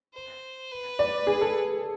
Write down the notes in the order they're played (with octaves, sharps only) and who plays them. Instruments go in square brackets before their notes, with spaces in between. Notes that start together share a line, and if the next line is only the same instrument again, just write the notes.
[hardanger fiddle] C5
B4
[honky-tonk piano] D5
G#4
A4